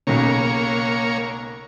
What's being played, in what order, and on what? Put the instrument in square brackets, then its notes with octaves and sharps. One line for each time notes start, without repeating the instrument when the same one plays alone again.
[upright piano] B1 C#3 [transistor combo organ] A#3 C#5